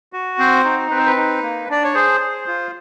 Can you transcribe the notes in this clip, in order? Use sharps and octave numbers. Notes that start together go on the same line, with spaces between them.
F#4
C4 C5
D#4
C4 B4
C5
B4
D#4
A#3
D4 D5
C#5
G#4 C5
G#4
F4